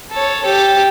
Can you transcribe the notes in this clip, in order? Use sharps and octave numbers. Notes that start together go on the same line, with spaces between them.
A4 C#5
G4 A4